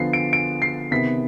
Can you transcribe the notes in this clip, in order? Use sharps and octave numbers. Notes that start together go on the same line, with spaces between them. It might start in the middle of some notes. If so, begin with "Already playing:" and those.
Already playing: D3 F3 B3 C7
D7
D7
C7
C3 D#3 B3 B6